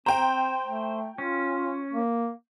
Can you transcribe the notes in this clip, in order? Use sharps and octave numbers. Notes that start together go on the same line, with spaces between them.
C4 C5 G5 A#5
A3
C#4 F4
A#3